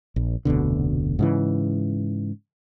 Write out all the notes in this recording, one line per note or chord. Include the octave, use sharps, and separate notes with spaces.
A#1
F1 D2 B2 D3
G#2 C#3 E3